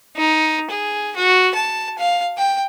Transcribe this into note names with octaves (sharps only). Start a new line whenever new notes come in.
D#4
G#4
F#4
A5
F5
G5